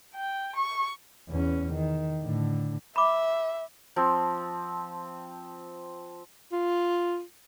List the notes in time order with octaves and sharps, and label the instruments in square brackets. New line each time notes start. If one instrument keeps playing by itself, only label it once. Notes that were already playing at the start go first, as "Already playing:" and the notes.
[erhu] G5
C#6
[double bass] E2 C#4
D#3
A2 D3
[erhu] E5 [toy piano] B5 D6
[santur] F3 C4
[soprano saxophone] F4